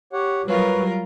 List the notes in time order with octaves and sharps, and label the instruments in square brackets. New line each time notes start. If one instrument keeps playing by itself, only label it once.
[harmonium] G4 C#5 F#5
[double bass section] F#3 G3 [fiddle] F4 A#4 [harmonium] B4 C#5